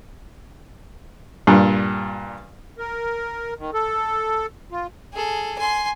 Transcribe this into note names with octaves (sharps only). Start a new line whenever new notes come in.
G2 A#2
A#4
D#3
A4
F4
G#4 A4
G#5 C6